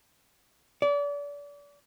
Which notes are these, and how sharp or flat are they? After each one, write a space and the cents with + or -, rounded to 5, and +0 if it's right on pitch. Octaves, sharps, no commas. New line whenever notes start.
D5 -35